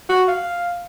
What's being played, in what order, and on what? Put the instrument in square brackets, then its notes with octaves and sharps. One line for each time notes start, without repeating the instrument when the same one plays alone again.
[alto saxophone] F#4
F5